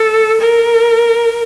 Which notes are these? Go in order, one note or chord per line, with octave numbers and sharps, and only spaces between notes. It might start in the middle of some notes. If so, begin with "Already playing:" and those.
Already playing: A4
A#4